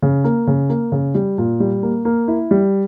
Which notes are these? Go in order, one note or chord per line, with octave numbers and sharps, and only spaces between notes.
C#3
A#3
C#3
A#3
C#3
G3
A#2
G3
A#3
A#3
E4
G3